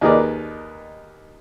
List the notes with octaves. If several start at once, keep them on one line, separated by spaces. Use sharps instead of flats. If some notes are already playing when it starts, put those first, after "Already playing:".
D#2 D#4 G#4 A#4 B4 D5